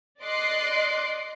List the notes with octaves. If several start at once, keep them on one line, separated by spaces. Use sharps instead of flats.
D5 D#5 C6 D6 F#6 C7